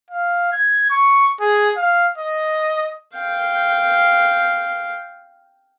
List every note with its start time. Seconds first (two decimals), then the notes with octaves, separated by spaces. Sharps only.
0.10 F5
0.52 G#6
0.90 C#6
1.40 G#4
1.77 F5
2.18 D#5
3.16 F5 G5